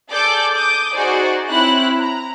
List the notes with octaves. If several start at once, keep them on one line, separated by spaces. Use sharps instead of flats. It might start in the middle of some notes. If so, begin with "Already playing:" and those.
G#4 A4 D5 A5 D6 G6
D6 D#6 G6
D#4 F#4 G#4 C5 D5
C4 E4 C#5 F#6
A#5